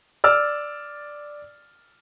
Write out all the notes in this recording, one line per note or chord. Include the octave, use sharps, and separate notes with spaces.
D5 E6 F6 A6